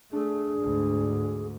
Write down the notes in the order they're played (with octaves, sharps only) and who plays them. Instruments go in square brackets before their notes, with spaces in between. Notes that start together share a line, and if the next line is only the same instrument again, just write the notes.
[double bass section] A3 [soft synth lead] D4 [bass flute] G#4
[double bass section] D2 G#2